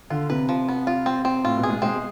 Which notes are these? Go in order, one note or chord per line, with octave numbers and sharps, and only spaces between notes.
D3 F4
C3 B4
F3
B3
F4
C4
C4
A2 F4
B2
G#4
G#3
G#3 C4